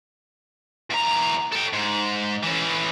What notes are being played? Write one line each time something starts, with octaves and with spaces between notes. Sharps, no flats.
E2 A#5
A4 G5
G#2
E3 C#4